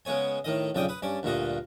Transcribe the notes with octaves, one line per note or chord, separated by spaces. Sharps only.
C#3 G#3 B3 C#5 G#5
A2 D#3 D#5
B1 F2 C#3 D5 G5 D#6
B4 D#6
G2 C#4 D5
D2 G2 A#2 F#4 D#5